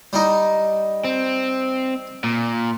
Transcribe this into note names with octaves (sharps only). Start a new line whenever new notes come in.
G3 D#4
C4
A#2